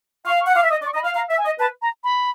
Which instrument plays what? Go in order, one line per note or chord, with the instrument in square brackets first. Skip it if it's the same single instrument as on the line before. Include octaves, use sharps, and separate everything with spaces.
[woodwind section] F5 [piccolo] C#6
[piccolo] C#6
[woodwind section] F#5
[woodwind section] F5 [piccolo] D6
[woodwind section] E5
[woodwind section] D#5 [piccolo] D#6
[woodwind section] D5
[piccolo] C#6
[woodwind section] D#5 [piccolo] A#5
[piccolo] B5
[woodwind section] F5
[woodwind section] F5 [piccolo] A#5
[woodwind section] E5
[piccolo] G#5
[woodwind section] D#5
[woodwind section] B4 [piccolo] A5
[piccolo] A#5
B5